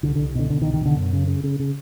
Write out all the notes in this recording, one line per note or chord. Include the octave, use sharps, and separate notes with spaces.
C2 D3
D3
C2
B2 D3
B2 D3
D#3
C2
D#3
B2 D3
F#2
C#3
C#3
C#3
C#3